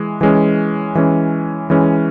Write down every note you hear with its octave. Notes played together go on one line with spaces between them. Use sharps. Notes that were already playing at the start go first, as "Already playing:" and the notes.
Already playing: E3 G#3
E3 G#3 C#4
E3 G#3 C#4
E3 G#3 C#4